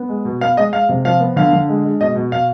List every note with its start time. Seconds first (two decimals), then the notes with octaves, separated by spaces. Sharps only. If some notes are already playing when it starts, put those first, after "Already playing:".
Already playing: B3
0.09 G#3
0.25 B2
0.41 B3 F5
0.57 G#3 D#5
0.73 G#3 F5
0.89 C3
1.05 F3 F5
1.20 B3
1.36 D3 F5
1.53 D3
1.69 G#3
1.84 G#3
2.01 B2 D#5
2.15 B2
2.32 B2 F5